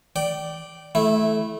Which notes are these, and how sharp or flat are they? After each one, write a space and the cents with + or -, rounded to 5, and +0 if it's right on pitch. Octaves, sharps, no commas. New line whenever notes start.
D5 +0 G5 -25
A3 -20 E4 +0